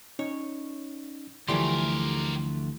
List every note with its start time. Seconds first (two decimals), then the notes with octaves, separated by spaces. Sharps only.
0.19 C#4 D#4 C#5
1.49 D2 E3 F3 G3 A3 G4 A#4 C6